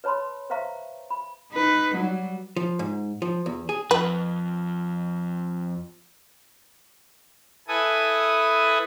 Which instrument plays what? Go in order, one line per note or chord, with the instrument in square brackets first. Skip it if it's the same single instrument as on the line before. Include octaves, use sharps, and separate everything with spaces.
[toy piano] B4 C#5 A5 B5 C6
B4 C5 E5 F5 A#5 C#6
B5
[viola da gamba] D#4 B4
F#3 G3
[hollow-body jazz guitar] F3
G#2
F3
E2
G#4
[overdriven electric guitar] F2 [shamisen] B4
[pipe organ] E4 A4 B4 G#5 D#6